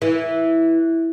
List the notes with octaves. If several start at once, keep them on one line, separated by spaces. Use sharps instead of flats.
E3